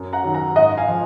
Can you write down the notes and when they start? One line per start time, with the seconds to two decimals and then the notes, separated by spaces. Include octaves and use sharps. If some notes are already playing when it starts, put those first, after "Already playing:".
Already playing: F#2
0.13 F#5 A#5
0.24 D#3 F#3
0.34 F#5 A#5
0.56 G#2 D#5 F#5
0.77 F5 G#5
0.88 F3